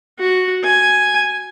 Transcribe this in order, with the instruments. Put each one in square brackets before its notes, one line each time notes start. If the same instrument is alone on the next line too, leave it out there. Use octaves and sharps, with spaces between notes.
[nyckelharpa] F#4
G#5